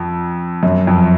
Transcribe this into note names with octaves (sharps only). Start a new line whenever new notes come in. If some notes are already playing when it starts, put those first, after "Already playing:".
Already playing: F2
F#2
F2